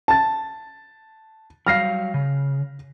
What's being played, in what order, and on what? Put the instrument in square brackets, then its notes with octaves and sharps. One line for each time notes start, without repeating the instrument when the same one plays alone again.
[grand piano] A5 A6
[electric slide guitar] F#3 G3 F5 [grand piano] F6 A#6 C7
[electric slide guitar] C#3